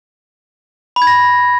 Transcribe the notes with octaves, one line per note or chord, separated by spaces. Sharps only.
B5
G#6
A#6